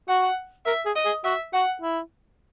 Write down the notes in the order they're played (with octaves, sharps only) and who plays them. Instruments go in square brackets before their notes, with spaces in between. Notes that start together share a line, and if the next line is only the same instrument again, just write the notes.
[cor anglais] F#4 [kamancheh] F#5
[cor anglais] A#4 [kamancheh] E5
[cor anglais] G#4
[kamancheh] D#5
[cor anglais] G#4
[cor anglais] F#4 [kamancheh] E5
[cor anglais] F#4 [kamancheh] F#5
[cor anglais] E4